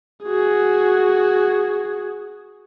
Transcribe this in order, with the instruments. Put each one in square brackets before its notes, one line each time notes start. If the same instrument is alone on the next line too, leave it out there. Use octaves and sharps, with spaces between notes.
[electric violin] F#4 G#4